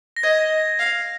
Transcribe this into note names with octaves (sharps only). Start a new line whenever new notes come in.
A#6
D#5 G#6
F5